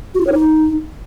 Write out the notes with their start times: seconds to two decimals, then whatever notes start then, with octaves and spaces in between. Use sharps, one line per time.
0.15 F#4
0.21 E4
0.27 C#5
0.33 D#4